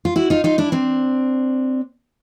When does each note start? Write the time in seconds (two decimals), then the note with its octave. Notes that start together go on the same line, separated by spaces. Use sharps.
0.05 F4
0.16 E4 F#4
0.30 D#4 F4
0.44 D#4 F4
0.58 D4 E4
0.72 C4 D4